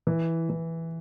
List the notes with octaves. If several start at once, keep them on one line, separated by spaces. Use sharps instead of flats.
E3
E3